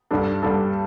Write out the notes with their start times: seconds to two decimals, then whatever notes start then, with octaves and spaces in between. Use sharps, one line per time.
0.11 G2 G3 D4 A4
0.43 G2 G3 D4 A4